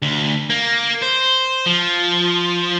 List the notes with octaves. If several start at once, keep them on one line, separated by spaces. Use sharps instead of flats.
D2
A#3
C5
F3